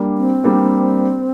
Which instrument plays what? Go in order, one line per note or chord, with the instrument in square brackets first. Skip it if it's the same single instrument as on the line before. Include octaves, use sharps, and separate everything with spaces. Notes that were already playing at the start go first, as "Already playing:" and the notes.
Already playing: [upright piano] G3 A#3 D4
[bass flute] C4
[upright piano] G3 A#3 D4